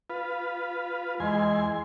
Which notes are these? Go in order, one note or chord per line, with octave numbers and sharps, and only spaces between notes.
F4 B4
E2 G#3 G#5 C6